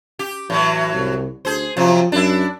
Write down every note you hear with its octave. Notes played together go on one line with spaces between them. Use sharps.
G4
A2 E3 F#3
C2
D2 G#4 C5
C3 F3 F#3
F#2 D4 E4